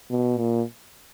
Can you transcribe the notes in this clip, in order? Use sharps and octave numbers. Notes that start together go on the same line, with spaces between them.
B2
A#2